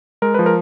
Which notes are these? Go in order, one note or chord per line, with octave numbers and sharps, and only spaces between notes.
G#3 A#4
F3 B4
A#4